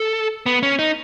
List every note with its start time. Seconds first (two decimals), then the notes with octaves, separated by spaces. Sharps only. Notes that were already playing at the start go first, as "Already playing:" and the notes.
Already playing: A4
0.46 B3
0.63 C#4
0.79 D#4